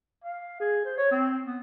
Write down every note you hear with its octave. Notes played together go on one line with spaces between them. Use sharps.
F5
G#4
C5
C#5
C4
B3